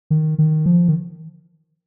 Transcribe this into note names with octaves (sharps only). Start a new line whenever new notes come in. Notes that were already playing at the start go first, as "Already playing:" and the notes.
D#3
D#3
F3
D#3